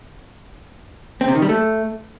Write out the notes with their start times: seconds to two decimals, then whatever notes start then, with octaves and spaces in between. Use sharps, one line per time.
1.21 C4
1.28 C3
1.35 D#3
1.42 G3
1.49 A3